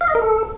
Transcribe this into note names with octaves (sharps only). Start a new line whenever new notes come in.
F5
D#5
A#4
A4